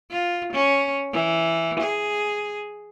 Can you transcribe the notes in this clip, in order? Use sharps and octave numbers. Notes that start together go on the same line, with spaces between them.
F4
C#4
E3
G#4